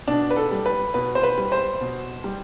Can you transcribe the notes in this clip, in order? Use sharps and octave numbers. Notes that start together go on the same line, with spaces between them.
B2 D4
B4
A4
G3
B4
B2 B4
C5
B4
G3
C5
B2
G3